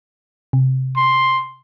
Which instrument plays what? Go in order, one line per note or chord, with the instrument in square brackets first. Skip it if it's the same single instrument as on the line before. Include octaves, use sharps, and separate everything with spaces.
[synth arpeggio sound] C3
[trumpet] C6